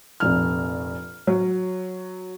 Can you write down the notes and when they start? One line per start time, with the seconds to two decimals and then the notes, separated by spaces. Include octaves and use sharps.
0.20 F1 A#1 F6
1.27 F#3